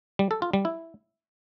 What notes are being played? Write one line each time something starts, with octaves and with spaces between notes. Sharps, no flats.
G3
A4
F4
G3
E4